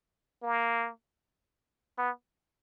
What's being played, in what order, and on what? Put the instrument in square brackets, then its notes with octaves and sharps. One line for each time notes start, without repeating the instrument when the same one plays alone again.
[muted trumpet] A#3
B3